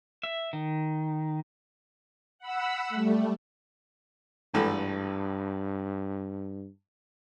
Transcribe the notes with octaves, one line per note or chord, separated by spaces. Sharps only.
E5
D#3
F#5 B5 E6
G3 A3
G#1 G2 E3 A3